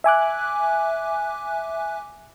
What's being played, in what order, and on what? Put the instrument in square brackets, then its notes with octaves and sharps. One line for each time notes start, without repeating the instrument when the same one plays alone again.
[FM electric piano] E5 G#5 D6 F#6